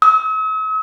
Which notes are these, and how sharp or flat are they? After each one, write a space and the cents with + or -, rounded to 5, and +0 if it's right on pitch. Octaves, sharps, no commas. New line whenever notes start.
E6 -45